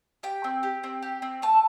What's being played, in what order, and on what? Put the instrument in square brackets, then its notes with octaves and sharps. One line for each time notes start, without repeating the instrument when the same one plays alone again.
[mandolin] G4 G5
C4
G4
C4
G4
C4
A3 A5